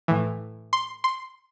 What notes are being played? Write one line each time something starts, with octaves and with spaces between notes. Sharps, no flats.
A2 E3
C6
C6